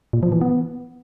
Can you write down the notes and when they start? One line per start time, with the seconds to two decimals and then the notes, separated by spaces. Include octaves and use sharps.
0.13 A#2
0.23 F3
0.32 E3
0.41 B3